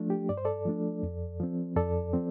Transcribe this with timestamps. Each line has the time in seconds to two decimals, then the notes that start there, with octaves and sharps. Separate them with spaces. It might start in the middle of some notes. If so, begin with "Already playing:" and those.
Already playing: F3 A3 D4
0.10 G4
0.29 G2 D5
0.37 C5
0.45 A4 D5
0.66 F3 A3 D4
1.03 F2
1.40 F3 C4
1.76 F2 A4 D5
2.13 F3 C4